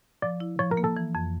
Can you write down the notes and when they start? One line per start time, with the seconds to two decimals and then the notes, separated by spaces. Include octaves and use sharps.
0.22 F3 D5
0.40 E4
0.59 F3 C#5
0.71 A#4
0.77 A#3
0.84 A4
0.96 E3
1.15 F2